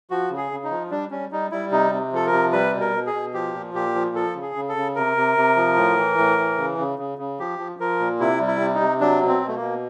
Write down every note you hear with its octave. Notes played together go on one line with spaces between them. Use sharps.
F3 F#4
C#3
G#4
C#3
D#4
F3
G3 D4
G3 C#4
G3 D#4
G3 E4
C3 D#4
C3
F3 A4
A#4
C3
G3 B4
B2
A#4
B2
G#4
B2
F3 G4
A#2
A#2 G4
F3
F3 A4
C#3
G#4
C#3
A4
C#3
C3 A#4
C3
C3
F3
A2
E3
A2
E3
C#3
C#3
C#3
C#3
F3 G4
F3
F3 A#4
A#2
C3 E4
G3
E4
C3
D#4
C3
F#3 D4
B2
C4
B2
A3
A#3
B2